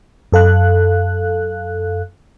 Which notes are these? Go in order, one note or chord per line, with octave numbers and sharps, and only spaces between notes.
F#2 A4 F5 F#6